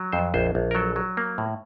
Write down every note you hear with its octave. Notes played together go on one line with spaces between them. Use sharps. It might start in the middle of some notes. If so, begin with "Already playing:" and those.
Already playing: F#3
F2 C5
A#1 C5
A#1
A#4
F#3 A4
F#3
A#3
A2